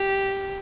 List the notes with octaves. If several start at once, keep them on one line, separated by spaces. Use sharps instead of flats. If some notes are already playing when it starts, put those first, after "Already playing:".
Already playing: G4